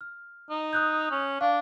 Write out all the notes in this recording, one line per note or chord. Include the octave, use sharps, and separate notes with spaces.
F6
D#4
D#6 F#6 G6
C#4
D4 F5